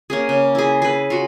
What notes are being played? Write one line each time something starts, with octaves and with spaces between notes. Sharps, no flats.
A#3 C#4 G#4
C#3
E4 G#4
G#4 B4
F4 F#4